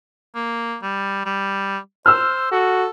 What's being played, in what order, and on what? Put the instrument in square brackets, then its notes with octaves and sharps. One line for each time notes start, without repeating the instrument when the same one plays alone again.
[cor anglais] A#3
G3
G3
[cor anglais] C5 [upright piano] E6 F6
[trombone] F#4 [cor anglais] A4